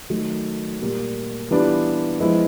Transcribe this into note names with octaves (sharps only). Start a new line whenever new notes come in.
D#3 F#3 A3
A#2 G3 A#3
E3 G3 B3 D4 F4
F3 G#3 B3 E4